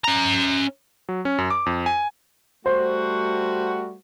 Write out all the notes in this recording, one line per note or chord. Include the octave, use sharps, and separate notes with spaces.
C#4 A#5
F#3
C#4
F#2
D6
F2
G#5
G3 A3 F#4 C5